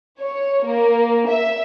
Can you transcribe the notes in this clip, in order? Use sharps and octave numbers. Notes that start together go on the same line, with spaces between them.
C#5
A#3
E5